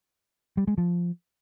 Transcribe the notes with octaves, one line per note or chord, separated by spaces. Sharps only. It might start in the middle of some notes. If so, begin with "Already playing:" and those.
G3
G#3
F3